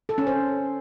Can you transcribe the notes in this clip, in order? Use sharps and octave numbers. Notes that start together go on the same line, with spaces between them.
A4
C#4
C5